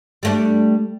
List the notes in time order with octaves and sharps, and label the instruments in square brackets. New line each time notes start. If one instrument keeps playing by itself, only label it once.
[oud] G3 A3 D4